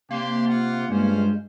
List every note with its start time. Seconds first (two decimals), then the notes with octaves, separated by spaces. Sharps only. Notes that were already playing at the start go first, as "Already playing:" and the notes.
0.11 C3 A#3 D4 G4 C6
0.47 F4 F#5
0.89 G2 G#3 C#4 F4 C5